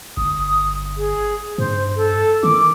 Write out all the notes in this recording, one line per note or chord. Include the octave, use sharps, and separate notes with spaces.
G1 D#6
G#4
G2 C5
A4
D#3 D6